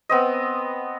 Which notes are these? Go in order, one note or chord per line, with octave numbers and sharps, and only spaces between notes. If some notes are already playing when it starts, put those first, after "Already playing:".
B3 C4 D#5